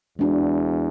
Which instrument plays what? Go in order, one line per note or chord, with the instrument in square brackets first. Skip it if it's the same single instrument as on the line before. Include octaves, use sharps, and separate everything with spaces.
[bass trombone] E2 [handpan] G#3 D4 F#4